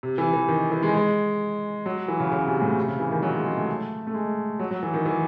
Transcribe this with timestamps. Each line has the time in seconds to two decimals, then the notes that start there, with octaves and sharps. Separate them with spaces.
0.03 C3
0.18 E3
0.34 E3
0.48 D#3
0.71 E3
0.83 G#3
0.94 G#3
1.86 F#3
2.08 E3
2.20 C#3
2.32 C#3
2.47 C3
2.62 A2
2.77 C3
2.88 C#3
3.00 E3
3.11 D#3
3.22 F#3
3.34 G#3
3.45 G#3
3.57 A3
4.07 A3
4.14 G#3
4.59 F#3
4.71 F#3
4.83 E3
4.94 D#3
5.05 E3